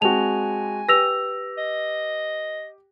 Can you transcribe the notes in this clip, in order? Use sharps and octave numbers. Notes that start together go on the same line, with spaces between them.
G#3 C4 F#4 G#5 A5 F7
G4 B4 E6 A#6 F7
D#5